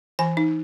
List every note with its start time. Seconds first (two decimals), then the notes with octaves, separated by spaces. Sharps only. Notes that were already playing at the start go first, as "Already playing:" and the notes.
0.19 E3 G#5
0.37 D#4